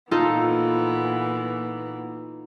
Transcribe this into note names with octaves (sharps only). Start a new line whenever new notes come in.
A#2 E3 B3 D#4 F4 A4